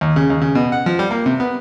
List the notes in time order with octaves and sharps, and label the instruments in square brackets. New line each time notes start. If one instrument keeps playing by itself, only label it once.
[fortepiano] D#2
C#3
D#2
C#3
B2
F#5
F3
G3
A#3
C3
B3